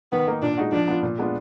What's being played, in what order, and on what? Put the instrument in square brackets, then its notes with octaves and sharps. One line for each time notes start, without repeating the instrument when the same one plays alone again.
[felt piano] D#3 [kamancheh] B3
[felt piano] A#3 D#4
[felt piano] A#2 [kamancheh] D4
[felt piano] G#3 D#4 F#4
[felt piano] F3 [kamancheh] D4
[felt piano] B3 F4
A#2
G#3 B3 D4 F4